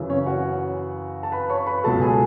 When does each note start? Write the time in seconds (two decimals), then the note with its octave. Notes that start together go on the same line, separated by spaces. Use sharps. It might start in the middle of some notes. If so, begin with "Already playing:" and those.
Already playing: F#2 C#3 E3
0.09 C#4 C#5
0.26 F#4 F#5
1.23 A5
1.32 B4 B5
1.49 C#5 C#6
1.67 B4 B5
1.84 C#2 B2 F#3 A4 A5
2.01 G#4 G#5